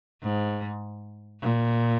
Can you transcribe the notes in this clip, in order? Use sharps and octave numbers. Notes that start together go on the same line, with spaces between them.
G#2
A#2